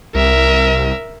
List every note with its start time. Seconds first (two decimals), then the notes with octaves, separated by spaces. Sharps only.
0.15 C2 A#4 E5